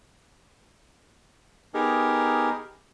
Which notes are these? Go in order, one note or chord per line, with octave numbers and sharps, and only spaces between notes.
B3 D#4 G4 G#4 A#4